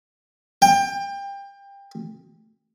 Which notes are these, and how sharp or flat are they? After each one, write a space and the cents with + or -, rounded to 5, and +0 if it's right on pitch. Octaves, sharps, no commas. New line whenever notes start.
G5 +25